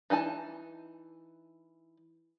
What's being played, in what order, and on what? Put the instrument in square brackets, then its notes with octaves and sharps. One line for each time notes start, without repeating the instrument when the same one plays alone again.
[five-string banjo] E3 D#4 G#5 A5